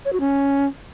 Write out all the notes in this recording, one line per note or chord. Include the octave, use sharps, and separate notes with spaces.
C#5
F#4
C#4